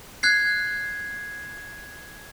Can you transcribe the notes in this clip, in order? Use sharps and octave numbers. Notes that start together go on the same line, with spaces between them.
F#6 G#6 C7